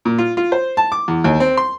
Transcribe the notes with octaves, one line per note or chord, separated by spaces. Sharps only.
A#2
F4
F4
C5
A5
D6
E2
D#2
C4
C6